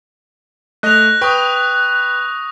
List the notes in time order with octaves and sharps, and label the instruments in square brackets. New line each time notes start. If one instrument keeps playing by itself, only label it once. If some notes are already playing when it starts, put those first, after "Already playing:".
[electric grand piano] A3 D#5 [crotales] F#6 A#6 F7
[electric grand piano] B4 G5 [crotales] C#6 D#6